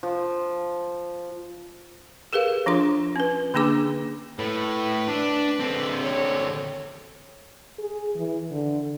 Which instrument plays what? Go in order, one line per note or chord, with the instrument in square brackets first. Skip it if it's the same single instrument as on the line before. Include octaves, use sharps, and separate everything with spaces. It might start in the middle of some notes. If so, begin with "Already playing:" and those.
[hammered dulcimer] F3
[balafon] G4 G#4 A#4 B4 F5
F3 D4 F4 C6
C#4 B4
D3 A#3 D4 G#4 D6
[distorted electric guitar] A2 [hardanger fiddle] B4
[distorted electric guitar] D4
D3 C4
[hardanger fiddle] C#5
[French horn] G#4
E3
D3